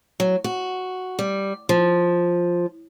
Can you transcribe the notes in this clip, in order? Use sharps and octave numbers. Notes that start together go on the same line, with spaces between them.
F#3
F#4
G3
F3